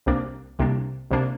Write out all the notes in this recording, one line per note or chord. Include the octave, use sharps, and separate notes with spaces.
C2 C3 A#3 D4
C2 C3 A#3 D4
C2 C3 A#3 D4